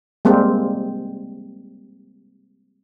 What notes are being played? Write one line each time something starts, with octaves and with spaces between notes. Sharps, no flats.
G3 G#3 A#3 C4